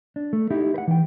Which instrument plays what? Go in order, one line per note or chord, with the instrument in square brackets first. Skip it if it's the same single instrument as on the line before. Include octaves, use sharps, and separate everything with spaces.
[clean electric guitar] D4
A3
D#4 E4 G4
B4 F#5
E3 G5